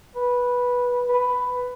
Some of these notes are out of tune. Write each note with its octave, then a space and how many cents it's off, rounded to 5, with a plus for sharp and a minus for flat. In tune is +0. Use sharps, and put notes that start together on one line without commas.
B4 -10
B4 +10